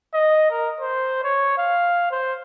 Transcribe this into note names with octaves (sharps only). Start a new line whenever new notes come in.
D#5
A#4
C5
C#5
F5
C5